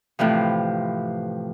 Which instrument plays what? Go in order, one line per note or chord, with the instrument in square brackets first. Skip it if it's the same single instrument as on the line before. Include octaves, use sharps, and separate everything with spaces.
[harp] A2 C3 E3 F3